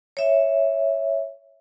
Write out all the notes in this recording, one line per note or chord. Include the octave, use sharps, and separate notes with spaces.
C#5 E5